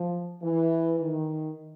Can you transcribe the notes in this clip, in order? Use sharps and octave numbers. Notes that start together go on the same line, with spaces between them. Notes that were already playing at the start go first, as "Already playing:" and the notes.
Already playing: F3
E3
D#3